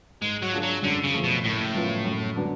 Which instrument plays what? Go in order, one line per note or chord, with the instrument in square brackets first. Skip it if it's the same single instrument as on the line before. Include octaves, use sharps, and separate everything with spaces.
[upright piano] G#2 [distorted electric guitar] G#3
[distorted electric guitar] F#3
[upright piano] G#3 D4 F4
[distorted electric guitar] F#3
[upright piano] F#2 [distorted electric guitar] D3
[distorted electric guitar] C#3
[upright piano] F3 A3
[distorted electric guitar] B2
[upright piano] F#1 [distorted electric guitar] A2
[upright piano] F#2 F3 B3 F4
F#2
D3 F#3 B3 D4